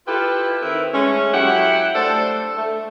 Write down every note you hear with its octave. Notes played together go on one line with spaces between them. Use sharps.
E4 F4 G4 A4 B4
D#3 C4 E4 A#4 B4
G#3 A3 C#4
F#3 E4 G4 F#5
A3 D4 A4 C5
A3